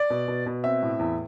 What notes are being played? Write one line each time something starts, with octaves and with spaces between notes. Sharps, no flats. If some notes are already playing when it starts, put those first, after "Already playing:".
Already playing: D5
B2
B2
B2
C4 E5
A2
E2